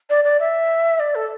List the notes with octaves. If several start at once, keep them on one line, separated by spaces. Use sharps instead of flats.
D5
D5
E5
D5
A4